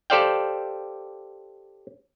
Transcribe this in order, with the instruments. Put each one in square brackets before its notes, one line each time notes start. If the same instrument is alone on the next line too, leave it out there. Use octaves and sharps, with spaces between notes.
[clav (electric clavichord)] G4 A4 C5 D5 F5 G5